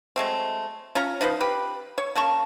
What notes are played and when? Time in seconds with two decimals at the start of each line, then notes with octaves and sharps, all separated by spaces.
0.16 F#3 G#3 A3 C4
0.95 C#4 F4 C#5 A#5
1.21 F3 D#4 B4 C5
1.40 G4 B4
1.98 C#5
2.15 C#3 A#3 A5 C#6